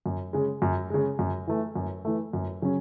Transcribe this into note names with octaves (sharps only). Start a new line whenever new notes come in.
F#2
C#3 G#3
F#2
C#3 G#3
F#2
E3 A3
F#2
E3 A3
F#2
C#3 F#3 C#4